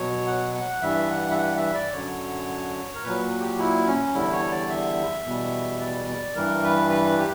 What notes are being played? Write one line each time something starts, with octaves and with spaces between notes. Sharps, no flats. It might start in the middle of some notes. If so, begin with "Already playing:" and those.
Already playing: B2 F#3 C#5
F#5
F#5
G2 E3 G3 E5
F#5
E5
F#5
E5
D5
F#2 D3 F#3 C#5
A#4
A#2 F#3 B4
G4
E4
C#4
E2 D3 G3 E4
C#5
D5
E5
E2 B2 G3
D5
D5
G2 E3 G3 A#4
B4
B4
G4